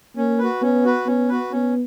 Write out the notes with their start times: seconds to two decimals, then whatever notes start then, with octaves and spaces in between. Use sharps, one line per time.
0.16 A#3 C#4
0.39 F#4 B4
0.62 B3 C#4
0.85 F#4 B4
1.06 B3 C#4
1.29 F#4 B4
1.52 B3 C#4